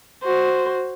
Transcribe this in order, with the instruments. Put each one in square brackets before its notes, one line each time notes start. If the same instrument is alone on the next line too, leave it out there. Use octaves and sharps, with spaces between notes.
[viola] F#4 C5